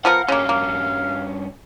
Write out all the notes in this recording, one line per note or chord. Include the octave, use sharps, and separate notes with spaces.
F3 B3 A#4 F5 F#5
G2 C#3 A#3 C#4
A#3